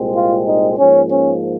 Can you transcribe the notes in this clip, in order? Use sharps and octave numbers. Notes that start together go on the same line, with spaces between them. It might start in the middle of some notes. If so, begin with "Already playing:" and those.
Already playing: C2 A#2 G#3 C4
F4
D#4
G#2 F3 A#3 C#4
C#4